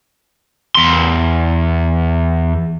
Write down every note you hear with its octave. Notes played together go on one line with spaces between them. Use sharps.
E2 C6